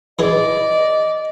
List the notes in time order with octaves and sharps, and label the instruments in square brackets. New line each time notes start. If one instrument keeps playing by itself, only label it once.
[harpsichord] E3 G#4 [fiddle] D5 [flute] D#5